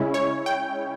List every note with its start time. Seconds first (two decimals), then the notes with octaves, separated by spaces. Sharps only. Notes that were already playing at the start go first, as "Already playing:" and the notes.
Already playing: C#3 G#3 C#4 E4
0.14 C#5
0.46 G5